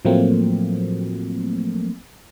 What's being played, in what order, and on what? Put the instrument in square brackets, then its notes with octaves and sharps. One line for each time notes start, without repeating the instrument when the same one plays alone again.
[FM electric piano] A2 F3 F#3 A3 A#3 C4